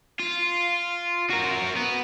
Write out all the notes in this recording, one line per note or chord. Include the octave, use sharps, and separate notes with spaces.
F4
F#4 A#4
B3